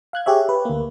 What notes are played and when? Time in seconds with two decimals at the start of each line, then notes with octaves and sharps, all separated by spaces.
0.13 F5 F#6 G#6
0.26 G4 G#4 C#5 E5
0.49 B4
0.65 D2 A#3